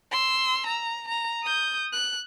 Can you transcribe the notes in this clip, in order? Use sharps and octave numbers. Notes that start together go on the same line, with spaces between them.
C6 E6
A#5
A#5
D#6 G6
F#6